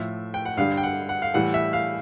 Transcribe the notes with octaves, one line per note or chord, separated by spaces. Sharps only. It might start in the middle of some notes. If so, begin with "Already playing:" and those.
Already playing: A2 F3 E5
G5
F#5
G2 D3 G3 F5
G5
F#5
F#5
F5
A2 E3 G3 F#5
E5
F5